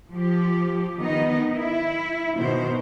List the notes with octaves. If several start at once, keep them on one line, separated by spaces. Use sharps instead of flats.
F3 G4
D#3 B3 D#4 D#5
E4
B2 D#3 C5